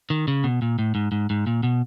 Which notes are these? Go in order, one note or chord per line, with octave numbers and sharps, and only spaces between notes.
D#3
C#3
B2
A#2
A2
G#2
G#2
G#2
A#2
B2